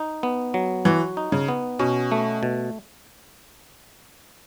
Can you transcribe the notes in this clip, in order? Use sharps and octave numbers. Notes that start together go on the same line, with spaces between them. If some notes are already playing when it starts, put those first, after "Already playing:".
Already playing: D#4
B3
F#3
E3 F#4
D#4
C#3
B3
B2 C#4
A3
B2